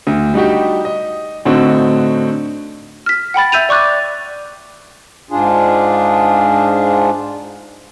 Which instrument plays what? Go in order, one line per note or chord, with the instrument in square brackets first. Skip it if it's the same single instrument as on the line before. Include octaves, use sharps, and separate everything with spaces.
[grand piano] D2
G3 D#4 F#4 G4
D#5
A2 D3 C4 D#4 F#4
[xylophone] F6 B6
F#5 G5 B5 A6
E5 E6 G6 D#7 F7
D5 C#6 D6 F#6 A6
[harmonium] G#2 D4 F4 G#4